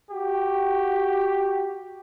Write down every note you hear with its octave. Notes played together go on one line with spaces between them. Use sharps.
F#4 G4